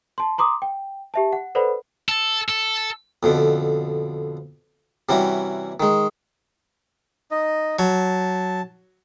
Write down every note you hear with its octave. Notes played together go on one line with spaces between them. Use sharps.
A5 C6
A#5 C6 D6 D#6
G5
G4 E5 A5
F#5
A4 B4 C5 D5 F#5 B5
A4
A4
F2 B2 D3
C3 E3 G3 C#4 F#4
D#3 G#3
D#4 D#5
F#3 A5